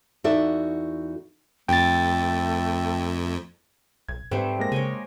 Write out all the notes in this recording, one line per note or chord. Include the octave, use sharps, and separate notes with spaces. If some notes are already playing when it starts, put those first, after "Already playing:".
E2 D#4 F#4 A4 D5 E5
F2 A3 G5 A6
B1 G#6
G#2 G3 A3 C4 B4 C5
G#3 A#3 A#6
C#3 C#5 G5 G#5